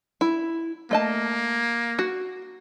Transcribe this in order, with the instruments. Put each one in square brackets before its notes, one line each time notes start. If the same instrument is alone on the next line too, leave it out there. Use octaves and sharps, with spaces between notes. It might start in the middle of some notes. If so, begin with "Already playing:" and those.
[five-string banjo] E4
[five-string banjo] A3 D#5 A5 [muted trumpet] A#3
[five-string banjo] F#4